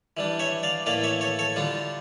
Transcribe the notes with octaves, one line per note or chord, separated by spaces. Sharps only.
E3 G3 D4
C#5 E5
D5 F5
A2 E3 A#3 E4 D5 F5
C#5 E5
A4 C#5
A4 C#5
D3 G3 D4 F4